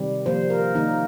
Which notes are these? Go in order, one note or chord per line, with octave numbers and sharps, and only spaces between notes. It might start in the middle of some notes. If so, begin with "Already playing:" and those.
Already playing: C3 D#3 G3
A#2 F3 A#3 C5
A#4
D#3 A#3 D#4